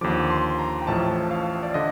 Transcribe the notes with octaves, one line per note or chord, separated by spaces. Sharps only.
D#2 D3 F3 D6
C6
A#5
G5
A1 A2 F3 A5
F5
D5
D3 D#5